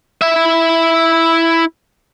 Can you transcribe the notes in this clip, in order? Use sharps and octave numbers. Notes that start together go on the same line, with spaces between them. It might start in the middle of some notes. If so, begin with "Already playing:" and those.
E4 E5